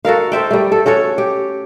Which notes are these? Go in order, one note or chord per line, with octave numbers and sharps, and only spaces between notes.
F#4 A4 A#4 F5
A4 C5 E5 G5
G3 A3
A4
C#4 F#4 A4 C#5
G4